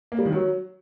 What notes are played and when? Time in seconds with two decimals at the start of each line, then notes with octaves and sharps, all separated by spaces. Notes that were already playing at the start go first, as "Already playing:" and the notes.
0.12 A#3
0.19 G3
0.25 D#3
0.32 F#3